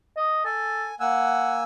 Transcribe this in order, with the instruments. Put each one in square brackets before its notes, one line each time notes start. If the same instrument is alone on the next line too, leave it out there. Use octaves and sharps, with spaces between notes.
[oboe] D#5
[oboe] A4 [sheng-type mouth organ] G#5
[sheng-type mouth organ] A#3 G#5 E6 [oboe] F#5